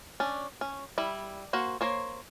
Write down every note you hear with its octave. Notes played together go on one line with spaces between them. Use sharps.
C#4 D4
C#4
G3 E4
A#3 F#4 C5
A#3 C5 C#5